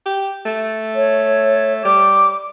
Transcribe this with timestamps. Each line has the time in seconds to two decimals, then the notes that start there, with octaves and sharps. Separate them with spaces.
0.06 G4
0.46 A3
0.95 C#5
1.85 G3 D6